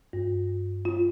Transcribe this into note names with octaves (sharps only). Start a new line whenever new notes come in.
G2
F4